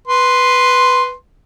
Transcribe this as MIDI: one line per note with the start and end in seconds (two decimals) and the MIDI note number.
0.08 1.13 71
0.08 1.13 84